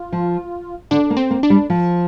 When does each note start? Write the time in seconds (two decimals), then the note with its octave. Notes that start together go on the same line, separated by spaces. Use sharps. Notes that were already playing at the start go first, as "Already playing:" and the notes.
Already playing: F4
0.12 F3
0.91 D3 D4
1.10 A#3
1.17 C4
1.31 A#3
1.43 D4
1.50 G3
1.70 F3